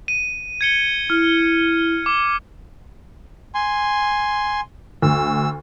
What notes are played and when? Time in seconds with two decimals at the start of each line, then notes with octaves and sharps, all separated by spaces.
0.08 D#7
0.61 G#6 C#7 G7
1.10 E4 F6
2.06 D6
3.55 G#5 C6
5.02 D2 E6